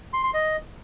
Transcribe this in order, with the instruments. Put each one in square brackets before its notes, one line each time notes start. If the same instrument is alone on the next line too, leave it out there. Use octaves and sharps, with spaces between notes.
[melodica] C6
C6
D#5